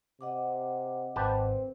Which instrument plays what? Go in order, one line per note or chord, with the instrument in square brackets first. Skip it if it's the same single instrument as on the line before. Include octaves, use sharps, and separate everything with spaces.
[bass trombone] C3 [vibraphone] D#5 F#5 D6
[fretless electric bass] G#1 [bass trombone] C4 [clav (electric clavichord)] G4 B4 A5